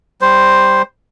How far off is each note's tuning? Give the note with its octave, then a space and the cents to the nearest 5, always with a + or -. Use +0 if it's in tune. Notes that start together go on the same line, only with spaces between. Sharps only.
G3 +0 C5 +0